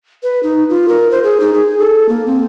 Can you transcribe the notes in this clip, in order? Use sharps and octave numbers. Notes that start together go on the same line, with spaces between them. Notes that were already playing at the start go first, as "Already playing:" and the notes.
B4
D#4
F4
A#4
C5
G#4
D#4
G#4
A4
A#3
C4